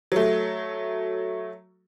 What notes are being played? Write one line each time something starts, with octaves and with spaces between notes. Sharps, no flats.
F#3 A3